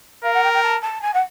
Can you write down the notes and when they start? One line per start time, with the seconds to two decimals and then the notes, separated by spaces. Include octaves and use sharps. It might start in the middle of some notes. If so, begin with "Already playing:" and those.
0.24 A#4 F5
0.34 F#5
0.43 G5
0.53 G5
0.63 A5
0.82 A5
1.02 G#5
1.14 F#5